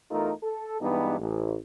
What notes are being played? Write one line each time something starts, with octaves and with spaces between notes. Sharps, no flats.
E2 A3 D#4 F4 A4 A#4
A4
G2 E3 G#3 B3 D#4 G4
A1